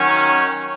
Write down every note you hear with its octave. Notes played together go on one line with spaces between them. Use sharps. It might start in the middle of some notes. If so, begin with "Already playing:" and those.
Already playing: D#3 F#3 C#4